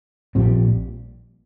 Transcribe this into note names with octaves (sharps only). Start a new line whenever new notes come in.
A#1 A#2 G3 C4